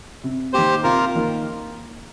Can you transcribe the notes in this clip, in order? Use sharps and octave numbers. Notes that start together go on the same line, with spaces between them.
C3
D#3 A#3 G4 C5
C3 F4 A#4
D#3 A#3